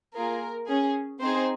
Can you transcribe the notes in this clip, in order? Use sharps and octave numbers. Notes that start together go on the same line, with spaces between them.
A#3 F4 G#4 A#4
C#4 G#4
C4 D#4 G#4 C5